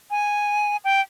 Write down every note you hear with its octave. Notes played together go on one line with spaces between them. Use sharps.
G#5
G5